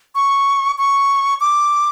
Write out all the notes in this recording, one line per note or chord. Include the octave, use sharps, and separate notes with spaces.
C#6
C#6
D6